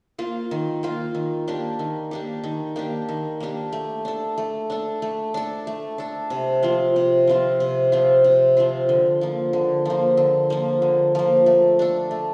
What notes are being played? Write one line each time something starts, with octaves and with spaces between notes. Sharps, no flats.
A#3 F4
D#3
A#3 F4
D#3
A#3 D4 G4
D#3
A#3 D4 G4
D#3
A#3 D4 G4
D#3
A#3 D4 G4
A3
D4 A4
A3
D4 A4
A3
D4 A4
A3
D4 A4
C3
F3 C4 F4
C3
F3 C4 F4
C3
F3 C4 F4
C3
F3 C4 F4
D3
F3 A#3
D3
F3 A#3
D3
F3 A#3
D3
F3 A#3
A3
D4 A4
A3